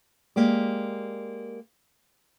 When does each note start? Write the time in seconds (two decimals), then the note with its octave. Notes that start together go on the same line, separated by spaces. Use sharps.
0.36 G#3 A#3 G4 D5